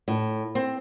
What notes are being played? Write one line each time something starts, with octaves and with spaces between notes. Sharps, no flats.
A2
C4